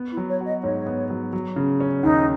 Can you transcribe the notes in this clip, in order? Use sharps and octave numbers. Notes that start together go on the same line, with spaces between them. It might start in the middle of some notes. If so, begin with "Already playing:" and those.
Already playing: B3
E4
F#3
C#5
F#4
D#5
G#2 C#5
B3
F#3
F#3
C#3
C#4
D#2 D#4